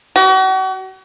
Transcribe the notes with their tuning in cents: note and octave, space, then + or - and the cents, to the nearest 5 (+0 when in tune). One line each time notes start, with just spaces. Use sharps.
F#4 +40